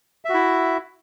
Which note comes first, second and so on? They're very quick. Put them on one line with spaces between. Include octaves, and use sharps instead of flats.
E5 F#4 E4